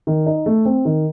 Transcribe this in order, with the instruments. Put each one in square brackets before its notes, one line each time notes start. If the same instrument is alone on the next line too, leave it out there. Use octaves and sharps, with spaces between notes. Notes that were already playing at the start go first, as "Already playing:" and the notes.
[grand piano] D#3
D#4
A3
C4
D#3